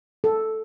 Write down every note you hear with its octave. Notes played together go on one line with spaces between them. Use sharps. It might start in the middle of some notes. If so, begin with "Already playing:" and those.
A4